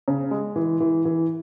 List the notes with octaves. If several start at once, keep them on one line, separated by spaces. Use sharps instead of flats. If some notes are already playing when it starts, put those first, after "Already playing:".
C#3
G#3
E3
E3
E3